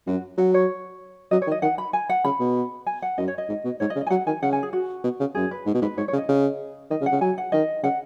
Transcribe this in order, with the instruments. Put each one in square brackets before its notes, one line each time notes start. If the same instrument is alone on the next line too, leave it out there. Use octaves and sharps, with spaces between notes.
[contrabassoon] F#2 [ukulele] F#4
[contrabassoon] F#3 [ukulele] F#5
[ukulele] C#5
[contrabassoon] F#3 [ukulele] D#5
[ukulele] C#5
[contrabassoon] D#3
[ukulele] D#5
[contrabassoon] D#3 [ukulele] F#5
[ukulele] B5
G#5
F#5
[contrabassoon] C#3 [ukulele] B5
[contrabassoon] B2
[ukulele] G#5
F#5
[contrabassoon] F#2 [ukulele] D#5
[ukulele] C#5
D#5
[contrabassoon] G#2
B2
[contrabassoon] G#2 [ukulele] C#5
[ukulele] D#5
[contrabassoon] C#3
[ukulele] D#5
G#5
[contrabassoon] F#3 [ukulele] F#5
[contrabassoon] D#3 [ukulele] G#5
[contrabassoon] C#3 [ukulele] F#5
[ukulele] G#5
G#4
F#4
[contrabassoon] B2
C#3
[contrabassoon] F#2 [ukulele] G#4
[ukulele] B4
[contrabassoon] G#2
B2
[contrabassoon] G#2 [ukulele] B4
[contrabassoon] G#2 [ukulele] C#5
[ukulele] C#5
[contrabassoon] C#3
[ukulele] D#5
[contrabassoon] C#3
[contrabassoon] D#3 [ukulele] D#5
[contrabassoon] C#3
[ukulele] F#5
[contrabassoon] C#3
[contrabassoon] F#3 [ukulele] G#5
[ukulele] F#5
[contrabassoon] D#3 [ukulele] D#5
[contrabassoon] C#3 [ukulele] F#5